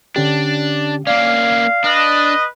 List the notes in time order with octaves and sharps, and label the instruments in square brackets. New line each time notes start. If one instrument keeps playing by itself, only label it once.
[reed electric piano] D3 C#4 G4 [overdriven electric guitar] D4
[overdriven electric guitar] A#3 C#4 [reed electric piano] D5 [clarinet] F5
[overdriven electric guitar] D4 [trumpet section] B4 D#5